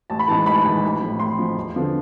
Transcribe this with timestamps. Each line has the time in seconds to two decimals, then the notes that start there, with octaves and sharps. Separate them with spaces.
0.10 A1 A5
0.19 B5
0.28 G#2 E3 A5
0.46 A1 B5
0.65 G#2 E3
0.83 A1
1.01 A2 F3
1.20 A1 C6
1.38 A2 F3
1.56 E2
1.75 D3 F3 B3